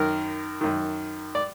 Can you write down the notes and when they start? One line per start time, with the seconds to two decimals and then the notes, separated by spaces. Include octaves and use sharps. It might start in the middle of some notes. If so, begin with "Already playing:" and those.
Already playing: F#2 D#3 A#4
0.61 F#2 D#3
1.35 D5